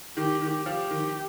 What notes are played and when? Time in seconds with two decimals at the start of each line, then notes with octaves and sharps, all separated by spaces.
0.17 D#3 G4
0.41 D#3
0.66 F3 G4
0.90 D#3